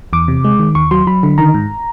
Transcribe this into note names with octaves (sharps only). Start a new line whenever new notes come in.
E2 D6
C3
G#3
D#3
D#2 C#6
F#3 C6
F#3 B5
D3
D#3 A#5
G#2